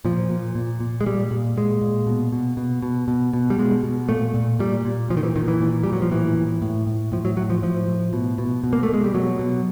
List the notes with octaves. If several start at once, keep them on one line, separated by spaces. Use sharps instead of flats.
A#2 F3
A#2
A#2
A#2
G#3
A#2 G3
A#2
A#2 G#3
A#2
B2
B2
B2
B2
B2
B2
G3
B2 G#3
B2
A#2 A3
A#2
A#2 G3
A#2
A#2 F3
D#3
E3
A#2 D#3
E3
A#2
A#2 G3
F#3
F3
A2 E3
A2
A2
A2
A2 F3
F#3
A2 F#3
F3
A2 F3
A2
B2
B2
B2
A#3
A3
B2 G#3
G3
B2 F#3
B2